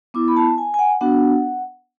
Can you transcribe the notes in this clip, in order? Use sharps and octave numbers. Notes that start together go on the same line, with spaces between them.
B3 E4 D6
B5
A5
G#5
G#5
F#5
B3 D4 F#4 F#5